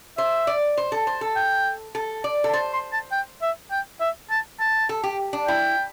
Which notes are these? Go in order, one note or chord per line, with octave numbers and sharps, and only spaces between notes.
C5 E5
D5
C5
A4
C5
A4
G5
A4
D5
A4
C5 A5
C6
A5
G5
E5
G5
E5
A5
A5
A4
G4
D4
E4 G5